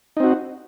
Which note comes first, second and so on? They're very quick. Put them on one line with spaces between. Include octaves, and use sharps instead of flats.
D#4 C4 F#4